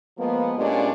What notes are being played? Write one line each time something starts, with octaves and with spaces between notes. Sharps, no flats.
F3 G#3 A#3 B3
A#2 G#3 A3 C#4 D4 G4